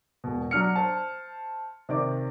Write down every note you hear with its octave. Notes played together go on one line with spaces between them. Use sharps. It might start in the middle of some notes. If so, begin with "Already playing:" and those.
E1 B2
F#3 D4 F6 C#7
C5 A5
C3 D#3 D5 D6